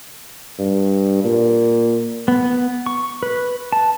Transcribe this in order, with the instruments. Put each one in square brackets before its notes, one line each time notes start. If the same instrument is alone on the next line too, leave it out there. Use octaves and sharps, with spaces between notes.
[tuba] G2
A#2
[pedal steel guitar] B3
C#6
B4
A5